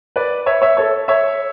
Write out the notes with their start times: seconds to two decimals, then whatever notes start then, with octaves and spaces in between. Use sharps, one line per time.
0.16 B4 D5
0.46 C#5 E5
0.62 C#5 E5
0.77 A4 C#5
1.08 C#5 E5